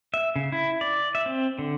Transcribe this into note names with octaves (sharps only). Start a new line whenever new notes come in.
E5
C#3
E4
D5
E5
C4
D3